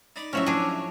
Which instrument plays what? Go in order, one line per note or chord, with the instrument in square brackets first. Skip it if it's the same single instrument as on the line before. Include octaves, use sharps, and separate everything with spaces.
[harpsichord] D#4 D5 B5
[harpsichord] A2 F3 F#3 [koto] C#4 F#4 E5
[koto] D4 G#4